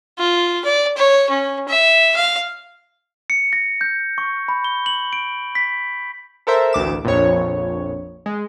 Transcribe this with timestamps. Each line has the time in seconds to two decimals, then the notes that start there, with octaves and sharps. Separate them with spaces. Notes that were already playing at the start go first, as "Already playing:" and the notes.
0.19 F4
0.65 D5
0.97 C#5
1.30 C#4
1.68 E5
2.16 F5
3.30 C#7
3.53 A#6
3.81 G6
4.18 C#6
4.48 B5
4.64 G7
4.86 F#7
5.13 D7
5.55 B6
6.47 A4 A#4 C5 E5
6.73 A1 D2 D6 E7
7.05 A#1 F2 C#5
8.26 G#3